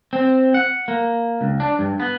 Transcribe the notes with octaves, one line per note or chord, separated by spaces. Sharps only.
C4
F#5
A#3
C#2
D4
G2
B3